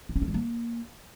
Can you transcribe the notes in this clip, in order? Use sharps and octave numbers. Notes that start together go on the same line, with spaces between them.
F4
C#4
A3
G3
A#3